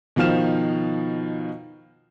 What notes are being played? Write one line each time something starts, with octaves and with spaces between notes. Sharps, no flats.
B2 D#3 F3 F5 F6 E7